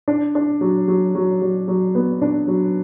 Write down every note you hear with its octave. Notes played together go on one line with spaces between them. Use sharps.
D4
D4
F#3
F#3
F#3
F#3
F#3
B3
D4
F#3